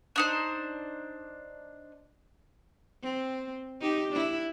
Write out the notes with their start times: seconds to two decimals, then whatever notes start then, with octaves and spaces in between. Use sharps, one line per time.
0.16 D4 D#4 C5
3.03 C4
3.81 D#4 G4
4.12 D4 E4